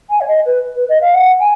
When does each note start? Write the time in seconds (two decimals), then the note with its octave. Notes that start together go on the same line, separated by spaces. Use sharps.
0.09 G#5
0.20 C#5
0.27 D#5
0.45 B4
0.75 B4
0.88 D#5
1.01 F5
1.13 F#5
1.39 G#5